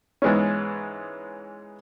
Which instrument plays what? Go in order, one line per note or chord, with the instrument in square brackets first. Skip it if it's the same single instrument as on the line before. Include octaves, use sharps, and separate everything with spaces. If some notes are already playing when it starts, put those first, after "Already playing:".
[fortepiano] G#2 E3 G#3 B3 C#4